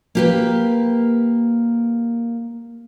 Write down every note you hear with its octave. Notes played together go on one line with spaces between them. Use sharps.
A#3 G4 B4